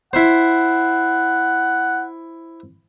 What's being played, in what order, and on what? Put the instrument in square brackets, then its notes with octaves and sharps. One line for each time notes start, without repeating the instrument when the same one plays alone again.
[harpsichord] E4 C5 [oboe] F#5